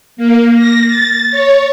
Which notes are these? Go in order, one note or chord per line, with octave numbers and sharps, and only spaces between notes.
A#3
A#6
A6
C#5